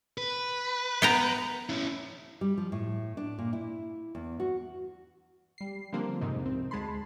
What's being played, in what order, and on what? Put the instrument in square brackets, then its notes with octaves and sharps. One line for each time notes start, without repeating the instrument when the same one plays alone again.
[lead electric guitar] B4
[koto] B3 G5 A#5
[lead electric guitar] C#4 E4
[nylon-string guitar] G3
F3
A2
D4
A#2
E4
E2
F#4
[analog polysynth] G3 C7
D3 F3 G3 A#3 C4
F2 G#2 C3 C4 D#4
C2 C4
D2 G#3 A5 B5 C6